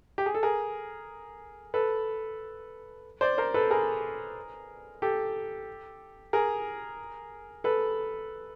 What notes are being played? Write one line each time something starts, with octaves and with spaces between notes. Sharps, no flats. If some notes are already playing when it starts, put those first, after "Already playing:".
G4
G#4
A4
G#4 A#4
A4 B4
C5 D5
A#4 C5
A4 B4
G#4 A#4
G4 A4
G#4 A#4
A4 B4